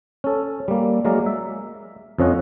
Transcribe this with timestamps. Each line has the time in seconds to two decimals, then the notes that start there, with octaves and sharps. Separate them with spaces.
0.24 C#4 A4
0.68 G3 A#3
1.05 F#3 G#3 A#3 A#4 D5
1.26 E5
2.18 F2 F3 C#4 D#5 F#5